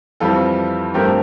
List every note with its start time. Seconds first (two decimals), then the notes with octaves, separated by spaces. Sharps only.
0.20 F2 E3 G3 C4 F4 A4
0.94 G2 F3 A3 C4 G4 A#4